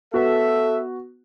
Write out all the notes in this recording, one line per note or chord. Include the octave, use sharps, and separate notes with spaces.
B3 F#4 A4 E5